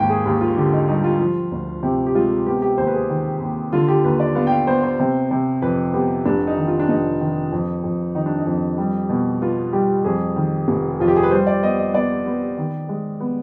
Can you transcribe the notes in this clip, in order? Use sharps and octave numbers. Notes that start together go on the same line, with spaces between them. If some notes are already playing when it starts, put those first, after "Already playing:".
Already playing: G#1 D#2 G5
G#4
D#2 G4
F4
D3 G4
D#4
G3 D#4
F4
F3
D2
C3 G4
G4
G#3 F4
B3 G4
G4
D#2 C5
B4
G#4
D#3
D#2
D3 F4
G4
D#2 B4
D5
B3 F5
G5
F5
B3 C5
C5
C3
C3
F2 B4
B3 G4
F1 D4
D#4
D#3
F4
D4
F1 D#4
D#3
F2
F2
D#3 D#4
D4
D#4
F2
G3
B2
B3 F4
G3 G4
F2 G#4
D#3
F1
F2 F4
G4
G#4
B4
G3 C5
D5
B3 D#5
D#5
B3 D5
B3
D#3
G#3
B3